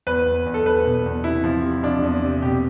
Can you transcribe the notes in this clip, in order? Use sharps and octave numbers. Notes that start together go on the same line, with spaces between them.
E2 B4
E2
E2
A4
E2 B4
B2
E2
C3 E4
F3
C3
F3 D4
E2
C3
B2 G4